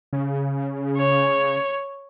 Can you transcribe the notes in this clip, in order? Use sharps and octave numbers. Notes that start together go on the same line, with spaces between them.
C#3
C#5